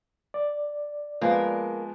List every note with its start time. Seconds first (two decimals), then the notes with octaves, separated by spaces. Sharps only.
0.34 D5
1.21 F3 G#3 A#3 B3